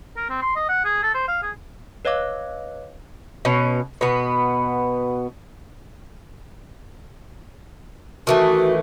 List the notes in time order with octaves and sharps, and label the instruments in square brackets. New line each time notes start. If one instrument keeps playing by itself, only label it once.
[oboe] A#4
C4
C6
D#5
F#5
G#4
A4
C5
F5
G#4
[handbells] B4 C#5 D#5 F5 D6 F#6
[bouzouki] B2 C#4
B2 B3
[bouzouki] D#3 E3 A3 [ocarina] F#4